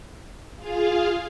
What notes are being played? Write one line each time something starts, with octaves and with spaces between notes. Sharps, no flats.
F4 G#4 F5